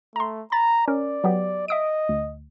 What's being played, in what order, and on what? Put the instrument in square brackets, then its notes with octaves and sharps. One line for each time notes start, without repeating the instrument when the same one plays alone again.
[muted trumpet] A3 [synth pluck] A#5 C6
[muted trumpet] A#5 [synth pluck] B5 A6
[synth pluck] C#4 A#4 [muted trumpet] D5
[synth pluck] F#3 B3 G4
[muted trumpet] D#5 [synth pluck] E5 D#6 D7
[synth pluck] D2